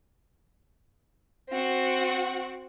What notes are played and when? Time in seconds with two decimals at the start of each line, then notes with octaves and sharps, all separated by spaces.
1.49 C4 F#4